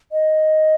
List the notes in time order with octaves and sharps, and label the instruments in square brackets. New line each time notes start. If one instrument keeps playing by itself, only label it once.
[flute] D#5